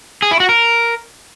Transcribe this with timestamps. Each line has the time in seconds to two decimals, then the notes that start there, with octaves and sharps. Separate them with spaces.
0.22 G#4
0.31 E4
0.40 F#4
0.49 A#4